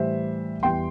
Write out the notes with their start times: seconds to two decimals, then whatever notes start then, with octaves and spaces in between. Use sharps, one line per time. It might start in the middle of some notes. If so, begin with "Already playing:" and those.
Already playing: A2 E3 G3 C5 E5
0.63 E2 E3 G3 G5 C6